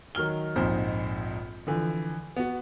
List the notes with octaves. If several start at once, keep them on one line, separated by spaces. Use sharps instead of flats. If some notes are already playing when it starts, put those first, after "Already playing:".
D#3 F#3 F6 G7
A#1 F2 G#2 D#4 C5
D3 E3 F3
B3 F#4